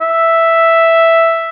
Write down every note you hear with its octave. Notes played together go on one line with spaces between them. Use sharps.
E5